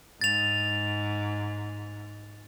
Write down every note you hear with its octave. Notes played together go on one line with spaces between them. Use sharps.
G#2 A6 F7